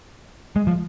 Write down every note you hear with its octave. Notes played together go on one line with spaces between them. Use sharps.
G#3
F3